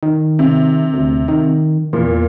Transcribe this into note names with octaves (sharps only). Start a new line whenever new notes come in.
D#3
C3
D2
D#3
E2 A#2